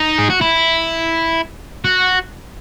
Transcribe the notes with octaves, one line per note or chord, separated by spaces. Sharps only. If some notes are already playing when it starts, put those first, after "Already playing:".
Already playing: D#4
G#4
F#4
E4
F#4